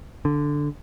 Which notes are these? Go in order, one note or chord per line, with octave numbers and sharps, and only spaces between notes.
D3